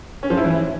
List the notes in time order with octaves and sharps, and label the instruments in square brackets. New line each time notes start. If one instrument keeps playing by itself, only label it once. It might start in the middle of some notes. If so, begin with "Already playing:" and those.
[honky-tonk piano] C#4
F3
E4
E3